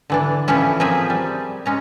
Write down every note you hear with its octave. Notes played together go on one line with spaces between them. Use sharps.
D3 E3 D4
A2 E3 F3 C#4 E4
F3 A#3 C4 G#4 E5 G#5
G3
G#3 C#4 A#5